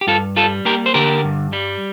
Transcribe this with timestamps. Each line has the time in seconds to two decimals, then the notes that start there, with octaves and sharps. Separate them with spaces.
0.01 G4
0.07 G2 F4 A4
0.36 G3 F4 A4
0.65 A#3 G4 A#4
0.86 C5
0.94 D3 G4 A#4
1.24 G2
1.53 G3